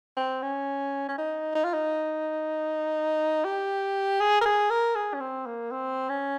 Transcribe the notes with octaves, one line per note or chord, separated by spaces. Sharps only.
C4
C#4
C#4
D#4
D#4
F4
D#4
G4
G#4
A#4
G#4
A#4
G#4
C#4
C4
A#3
C4
C#4